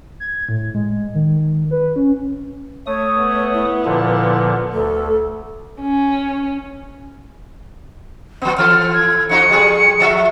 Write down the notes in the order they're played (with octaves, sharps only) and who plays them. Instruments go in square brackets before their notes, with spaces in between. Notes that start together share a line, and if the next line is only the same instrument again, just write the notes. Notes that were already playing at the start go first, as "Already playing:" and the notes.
[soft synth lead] G#6
A2
G#3
D#3
B4
C#4
[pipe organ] A3 D#6 [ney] C#5
[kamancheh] B3
[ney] E4
[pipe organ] A#2 D3 F3
[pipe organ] D2 [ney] A4
[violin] C#4
[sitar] F3 B3
[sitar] E3 A4 [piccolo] F6
[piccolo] G#6
[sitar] F3 D#4 F#4 [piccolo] C#7
[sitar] F3 G3 G#4
F3 D5 E5